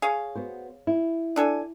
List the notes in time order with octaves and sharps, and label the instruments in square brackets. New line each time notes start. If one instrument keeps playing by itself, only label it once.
[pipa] G#4 C#5 F5
[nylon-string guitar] B3 F#4 C5
E4
[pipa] D4 A4 G#5